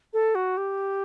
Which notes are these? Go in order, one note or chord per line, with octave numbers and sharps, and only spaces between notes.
A4
F#4
G4